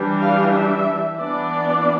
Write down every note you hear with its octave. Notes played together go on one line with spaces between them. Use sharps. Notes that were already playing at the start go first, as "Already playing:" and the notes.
Already playing: E3 G3 D4
F5
E5
E3 B3 D4 D5